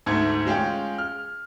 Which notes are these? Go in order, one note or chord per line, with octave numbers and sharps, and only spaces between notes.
D2 G#2 A3 G#6
G#3 C#4 F4 G5
F6